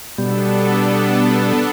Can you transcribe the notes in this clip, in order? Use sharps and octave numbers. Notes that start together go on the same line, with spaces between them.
B2 G3 B3 D4 A4